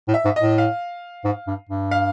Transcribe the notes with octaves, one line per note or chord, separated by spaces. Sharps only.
A2
E5
G#2
D#5
A2
F5
G#2
G2
G2
F5